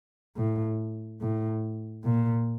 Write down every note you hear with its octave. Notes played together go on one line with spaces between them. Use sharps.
A2
A2
A#2